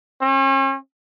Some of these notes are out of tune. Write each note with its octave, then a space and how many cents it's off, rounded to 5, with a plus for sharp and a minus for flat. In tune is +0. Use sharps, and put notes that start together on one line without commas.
C#4 -40